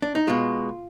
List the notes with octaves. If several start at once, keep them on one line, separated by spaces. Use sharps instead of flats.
D4
D#4
B2 G#3 F4